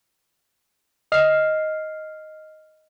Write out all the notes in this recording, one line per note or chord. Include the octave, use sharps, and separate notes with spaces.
D#5 F6 C7